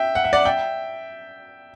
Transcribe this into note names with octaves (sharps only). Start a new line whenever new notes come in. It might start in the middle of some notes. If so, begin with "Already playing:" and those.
Already playing: E5 G5
F#5
E5
D5 F#5
E5 G5